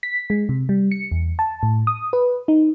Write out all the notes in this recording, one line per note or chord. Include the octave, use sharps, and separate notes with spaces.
B6
G#3
C3
G3
C#7
E2
A5
A2
D#6
B4
D#4